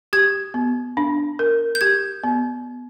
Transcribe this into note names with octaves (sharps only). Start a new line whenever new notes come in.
G4 G#6
B3
D4
A#4
G6
G4 G#6
B3